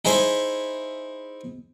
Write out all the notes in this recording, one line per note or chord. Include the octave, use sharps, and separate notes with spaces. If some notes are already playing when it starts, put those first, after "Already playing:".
D#4 E4 G#4 C5 G#5